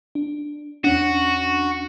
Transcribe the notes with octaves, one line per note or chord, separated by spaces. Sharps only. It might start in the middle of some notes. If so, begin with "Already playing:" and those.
D4
E2 C#4 D4 F#4